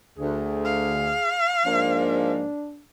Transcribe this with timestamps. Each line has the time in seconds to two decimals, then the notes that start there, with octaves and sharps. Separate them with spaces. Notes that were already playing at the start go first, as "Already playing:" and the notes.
0.17 D2 G#4
0.65 F5
1.66 G#2 F3 A#3 D4